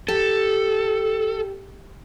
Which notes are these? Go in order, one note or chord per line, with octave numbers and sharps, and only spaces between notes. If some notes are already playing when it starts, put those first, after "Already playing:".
G4 A4